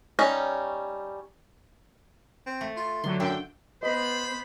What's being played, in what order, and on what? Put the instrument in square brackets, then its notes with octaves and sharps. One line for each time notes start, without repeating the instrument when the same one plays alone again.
[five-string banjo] G3 C#4 D#4
[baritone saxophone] C4
[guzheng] A3
[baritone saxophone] F4
[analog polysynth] D3 F#3 [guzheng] C6
[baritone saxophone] F#2 [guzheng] D3 [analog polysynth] G5
[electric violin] B3 C5 [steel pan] B4 D#5 [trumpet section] B5